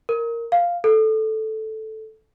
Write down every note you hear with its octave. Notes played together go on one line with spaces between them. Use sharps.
A#4
F5
A4